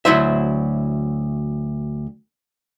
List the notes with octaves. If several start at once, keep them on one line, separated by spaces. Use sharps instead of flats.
D2 C#3 F#3 E4 C5 E5